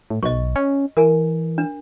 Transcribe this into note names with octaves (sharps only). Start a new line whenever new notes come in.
A2
B1 D#5 C#6
C#4
E3 A#4 G#5
D4